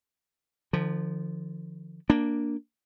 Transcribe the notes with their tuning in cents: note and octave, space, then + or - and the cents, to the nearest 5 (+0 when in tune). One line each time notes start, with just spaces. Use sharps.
D3 +35 F3 -15
A#3 +0 D4 +0